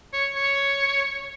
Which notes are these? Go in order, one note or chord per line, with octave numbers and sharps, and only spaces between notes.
C#5
C#5